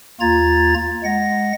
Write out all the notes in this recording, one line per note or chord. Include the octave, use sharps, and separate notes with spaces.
D#2 A#3 F4 A#5 G#6 A6
G#3 F#5 A#6